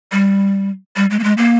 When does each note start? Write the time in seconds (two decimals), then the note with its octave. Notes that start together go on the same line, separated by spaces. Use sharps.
0.12 G3
0.96 G3
1.10 G#3
1.19 A#3
1.24 G#3
1.37 A#3